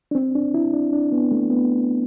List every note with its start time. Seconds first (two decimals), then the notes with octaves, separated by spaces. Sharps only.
0.11 D4
0.15 C4
0.35 D4
0.54 E4
0.74 D4
0.93 D4
1.12 B3
1.31 A3
1.51 B3